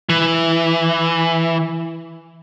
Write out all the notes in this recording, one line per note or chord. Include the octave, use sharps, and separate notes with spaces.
E3